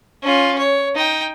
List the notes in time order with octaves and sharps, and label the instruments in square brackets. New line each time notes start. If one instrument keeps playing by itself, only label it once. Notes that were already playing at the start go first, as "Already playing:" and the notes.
[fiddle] C#4 F4
C#5
D#4 G5